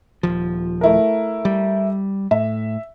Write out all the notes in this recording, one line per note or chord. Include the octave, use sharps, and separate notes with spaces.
D#1 F3
A3 E4 A#4
G3
A2 E5